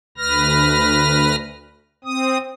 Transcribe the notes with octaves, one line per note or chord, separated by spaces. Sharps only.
D2 B4 F6 A#6
C4 D#6